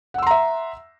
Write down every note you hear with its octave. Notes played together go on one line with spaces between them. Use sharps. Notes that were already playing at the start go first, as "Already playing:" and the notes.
E5 F#5 A#5 C6 E6